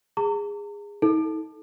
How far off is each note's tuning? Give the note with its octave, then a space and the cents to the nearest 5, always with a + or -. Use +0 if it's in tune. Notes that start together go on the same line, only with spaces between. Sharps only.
G#4 -20 A#5 -40 C#6 +45
D#4 +45 A4 -5